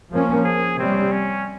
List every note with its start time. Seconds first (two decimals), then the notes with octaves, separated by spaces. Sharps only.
0.11 F3 A#3 C#4
0.45 G#4
0.78 C3 G3 C4 C#4
1.11 C#4